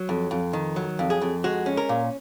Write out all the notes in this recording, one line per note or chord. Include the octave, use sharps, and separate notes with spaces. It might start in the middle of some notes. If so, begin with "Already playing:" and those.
Already playing: F#3
F2
F2
D#3
F#3
F2
G#4
F2
G#3 F#4
C#4
A#4
A#2